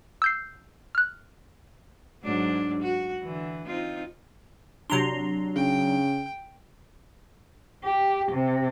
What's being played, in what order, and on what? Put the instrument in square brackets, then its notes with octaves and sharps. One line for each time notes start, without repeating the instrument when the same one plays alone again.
[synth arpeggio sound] E6 G6 C7
F6 F#6
[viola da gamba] G#2 F#3 D4
F#4
D3 E3
C4 D#4 F4
[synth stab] C3 A#5 C6 [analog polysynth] F#3 D4
[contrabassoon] C#3 [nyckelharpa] G5
[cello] G4
C3